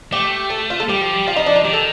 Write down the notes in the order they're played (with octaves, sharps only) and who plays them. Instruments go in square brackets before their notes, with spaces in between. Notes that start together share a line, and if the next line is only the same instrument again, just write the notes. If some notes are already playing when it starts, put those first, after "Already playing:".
[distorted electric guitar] A3 [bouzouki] G4
[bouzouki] A4
F4
A4
[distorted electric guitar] G3 [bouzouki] G4
[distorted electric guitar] F3
G3
[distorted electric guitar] F3 [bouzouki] F4
[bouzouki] D#4
D4
D#4
[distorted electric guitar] D#3 [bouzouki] G4
[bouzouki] A4